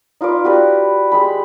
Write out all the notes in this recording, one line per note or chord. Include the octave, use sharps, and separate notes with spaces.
D#4 F4 B4 D5
F#4 G4 B4 D5
G#3 G4 B5